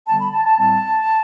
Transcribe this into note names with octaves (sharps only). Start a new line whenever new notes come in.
D3 G3 B3 A5
B5
A5
A5
A2 G3 C4 A5